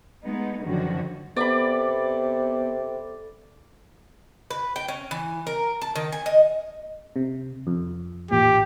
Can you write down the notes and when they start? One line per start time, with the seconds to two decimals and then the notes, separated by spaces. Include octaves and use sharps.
0.22 G#3 A3 B3 D#4
0.64 F#2 D3 D#3 F3 F#4
1.37 C3 B3 A4 D5 B5 D6
4.50 B4
4.76 G5
4.88 C#4
5.11 E3
5.47 A#4
5.81 A5
5.95 D#3
6.12 G#5
6.26 D#5
7.16 C3
7.67 F2
8.31 A1 A#2 G4